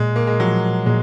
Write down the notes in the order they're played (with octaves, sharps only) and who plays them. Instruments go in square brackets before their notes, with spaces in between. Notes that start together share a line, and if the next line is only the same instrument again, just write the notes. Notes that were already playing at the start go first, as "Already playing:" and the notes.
Already playing: [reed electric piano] A#2 [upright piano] G#3
[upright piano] A#3
G#3
[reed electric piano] F3 [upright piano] F#3
[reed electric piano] A#2 [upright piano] G#3